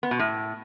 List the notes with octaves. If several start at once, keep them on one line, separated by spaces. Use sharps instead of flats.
B3
B2
A2